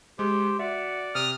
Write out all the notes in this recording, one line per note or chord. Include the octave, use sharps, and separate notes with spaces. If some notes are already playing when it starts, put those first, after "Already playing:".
G#3 G4 C5
F#4 D5 E5
C3 D#6 F6